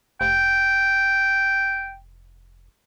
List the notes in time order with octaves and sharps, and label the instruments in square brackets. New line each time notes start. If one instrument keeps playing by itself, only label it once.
[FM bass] F1 [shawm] G5